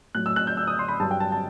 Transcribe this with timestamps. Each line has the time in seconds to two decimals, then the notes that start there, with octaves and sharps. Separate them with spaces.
0.15 A2 F#3 F#6
0.26 E6
0.36 F#6
0.47 G6
0.57 E6
0.67 D#6
0.79 C6
0.88 B5
0.99 G2 A5
1.03 F#3
1.11 G5
1.20 A5
1.32 A5